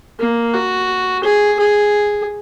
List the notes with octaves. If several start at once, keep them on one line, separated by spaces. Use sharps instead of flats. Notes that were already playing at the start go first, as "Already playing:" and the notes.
A#3
F#4
G#4
G#4